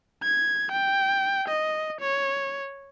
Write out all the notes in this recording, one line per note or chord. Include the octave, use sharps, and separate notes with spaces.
G#6
G5
D#5
C#5